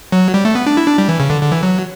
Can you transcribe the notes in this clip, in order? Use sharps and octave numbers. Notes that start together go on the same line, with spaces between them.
F#3
G3
A3
B3
D4
E4
D4
G3
E3
C#3
D3
D3
E3
F#3